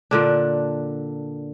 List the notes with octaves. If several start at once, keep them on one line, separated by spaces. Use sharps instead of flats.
A#2 D3 D4